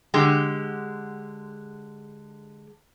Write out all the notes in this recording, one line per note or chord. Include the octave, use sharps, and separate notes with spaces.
D3 G#3 G4